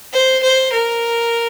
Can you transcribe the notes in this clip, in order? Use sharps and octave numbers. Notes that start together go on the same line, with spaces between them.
C5
C5
A#4